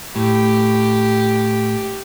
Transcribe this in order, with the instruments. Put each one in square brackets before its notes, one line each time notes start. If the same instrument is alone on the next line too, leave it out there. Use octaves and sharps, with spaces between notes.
[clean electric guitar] A2 [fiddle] G4